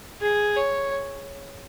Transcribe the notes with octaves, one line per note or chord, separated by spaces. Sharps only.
G#4
C#5